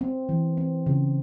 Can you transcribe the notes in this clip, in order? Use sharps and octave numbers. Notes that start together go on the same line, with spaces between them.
C4
E3
C4
C#3